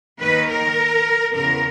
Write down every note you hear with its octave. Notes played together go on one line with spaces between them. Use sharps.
D#2 D#3 B4
A#4
E2 C#3 E3 A#4